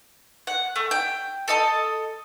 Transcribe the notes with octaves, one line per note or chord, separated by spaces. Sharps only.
F#5
A3
G5
A4 D#5 A5